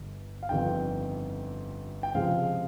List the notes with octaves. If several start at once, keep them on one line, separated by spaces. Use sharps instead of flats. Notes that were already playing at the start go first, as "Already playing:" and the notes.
Already playing: G1 G2
F5
G1 F2 D#3 G5
G5
C#2 C3 F3 G#3 F5